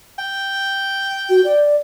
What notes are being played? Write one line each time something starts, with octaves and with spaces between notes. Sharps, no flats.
G5
F#4
D5